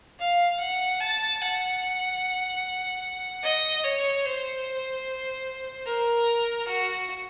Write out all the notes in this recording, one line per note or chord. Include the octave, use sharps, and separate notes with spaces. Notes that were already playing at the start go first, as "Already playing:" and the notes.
F5
F#5
A5
F#5
D#5
C#5
C5
A#4
F#4